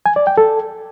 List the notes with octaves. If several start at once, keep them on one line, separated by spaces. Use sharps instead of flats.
G#5
D5
G5
A4